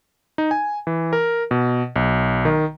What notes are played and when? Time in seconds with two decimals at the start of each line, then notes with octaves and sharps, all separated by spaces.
0.38 D#4
0.51 G#5
0.87 E3
1.13 A#4
1.51 B2
1.96 B1
2.45 D#3